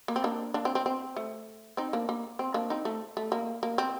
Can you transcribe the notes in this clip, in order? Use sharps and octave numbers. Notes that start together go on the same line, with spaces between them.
A#3
C4
A#3 D4
A#3 D4
C4
C4
C4
A3
C4 D#4
A#3 D4
A#3
C4
A#3 D4
C4 D#4
A3
A3
A#3
A#3
C4